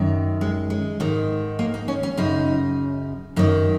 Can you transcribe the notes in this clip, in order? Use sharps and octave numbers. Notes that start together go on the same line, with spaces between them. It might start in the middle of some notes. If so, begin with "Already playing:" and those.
Already playing: F#2 D#3
G#3
G#3
G#2 D#3
A#3
D#4
C#4
C#4
F#2 C#3 D#4
F#2 D#3 D#4